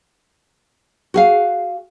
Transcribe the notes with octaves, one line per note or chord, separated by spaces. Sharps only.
F#4 G#4 F5